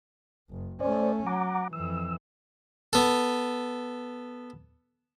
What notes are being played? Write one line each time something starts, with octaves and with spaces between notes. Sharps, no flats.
F#1
A3 C#4 C5 D5
F#3 F#5 A#5 D6
F2 E3 E6
B3 A4